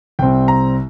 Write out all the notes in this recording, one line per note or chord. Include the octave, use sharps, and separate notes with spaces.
C2 C3 G3 C4 G5
A#5